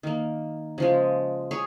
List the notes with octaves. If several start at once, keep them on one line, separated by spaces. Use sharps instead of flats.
D#3 A#3
C#3 F3 G#3
G#4 C#5